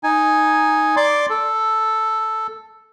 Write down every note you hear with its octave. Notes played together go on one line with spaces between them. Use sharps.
D#4 G#5
D5 C6 D6
A4